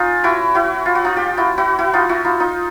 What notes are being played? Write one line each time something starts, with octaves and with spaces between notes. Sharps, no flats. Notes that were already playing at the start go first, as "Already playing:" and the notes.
Already playing: C#4 D#4 F4
E4 F#4
E4 F#4
F4
F#4
D#4 F4
F4 G4
E4 F#4
E4 F#4
E4 F#4
D#4 F4
E4 F#4
D#4 F4
D#4 F4